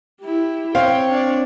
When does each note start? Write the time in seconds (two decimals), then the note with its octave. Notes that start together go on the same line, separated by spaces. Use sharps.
0.21 E4 G4
0.75 C4 C#5 F5 G5
1.09 D4 D5